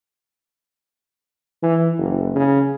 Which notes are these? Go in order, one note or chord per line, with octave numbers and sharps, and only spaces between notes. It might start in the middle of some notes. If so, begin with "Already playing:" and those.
E3
F#1
C#3